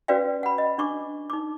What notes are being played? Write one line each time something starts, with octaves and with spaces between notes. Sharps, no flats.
C#4 F#4 B4 D5 F5 G5
F#5 B5
D#5
D4 C#6 D6
D#4 D6